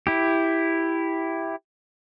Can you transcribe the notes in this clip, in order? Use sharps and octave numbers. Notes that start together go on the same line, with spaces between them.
E4 G4